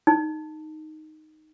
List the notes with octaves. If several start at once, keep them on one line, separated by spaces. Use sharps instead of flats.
D#4